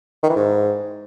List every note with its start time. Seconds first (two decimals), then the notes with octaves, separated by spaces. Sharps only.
0.23 D#3
0.30 E3
0.36 G#2